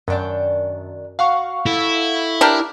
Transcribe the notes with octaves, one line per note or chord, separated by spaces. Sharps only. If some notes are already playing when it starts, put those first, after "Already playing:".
F#2 D#3 D4 G5
F#4 F5 F#5 C#6
E4 A4
D4 G4 A#4